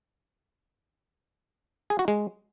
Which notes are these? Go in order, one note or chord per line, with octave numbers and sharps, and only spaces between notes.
G#4
F#4
G#3